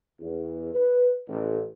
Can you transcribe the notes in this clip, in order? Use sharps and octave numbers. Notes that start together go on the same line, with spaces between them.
E2
B4
A1